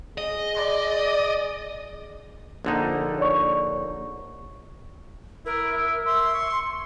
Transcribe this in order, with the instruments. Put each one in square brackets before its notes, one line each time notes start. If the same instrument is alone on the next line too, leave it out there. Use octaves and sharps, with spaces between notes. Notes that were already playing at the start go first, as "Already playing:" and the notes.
[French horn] G#4 [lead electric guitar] D#5
[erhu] D5
[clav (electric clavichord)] A#1 D3 D#4
[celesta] C#5 D5 C#6
[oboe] E4 [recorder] A#4
[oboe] E5
[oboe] E5 [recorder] C6
[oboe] C#6